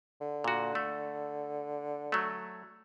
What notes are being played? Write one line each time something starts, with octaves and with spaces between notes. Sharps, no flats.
D3
A#2 F#4
A3
F#3 A3